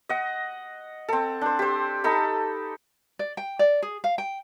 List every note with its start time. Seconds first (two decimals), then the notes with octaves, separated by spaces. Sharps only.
0.09 D#5 F#5
1.09 C4 A4
1.41 D4 C5
1.59 G4 C5
2.04 D#4 A4 B5
3.19 D5
3.37 G5
3.59 D5
3.82 G#4
4.04 F5
4.18 G5